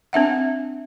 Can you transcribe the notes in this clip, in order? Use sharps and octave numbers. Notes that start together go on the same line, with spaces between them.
C4 D4 E5 F#5